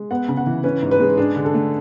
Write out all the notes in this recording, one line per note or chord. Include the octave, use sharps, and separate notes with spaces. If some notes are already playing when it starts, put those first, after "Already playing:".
Already playing: G#3
B3 F#5
C#3
F#5
E3
C#4 B4
G#2
B4
G#3
D4 G#4
D3
A4
A3